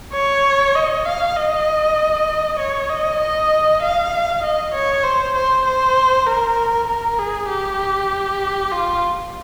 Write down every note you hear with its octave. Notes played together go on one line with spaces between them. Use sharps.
C#5
D#5
F5
D#5
C#5
D#5
D#5
F5
D#5
C#5
C5
C5
C5
A#4
A#4
G#4
G4
F4